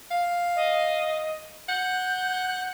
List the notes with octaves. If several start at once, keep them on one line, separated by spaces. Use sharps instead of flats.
F5
D#5
F#5 G6